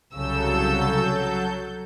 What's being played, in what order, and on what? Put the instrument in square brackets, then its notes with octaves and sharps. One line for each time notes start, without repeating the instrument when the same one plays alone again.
[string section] C2 C#3 E6 [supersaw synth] F#3 A4 G6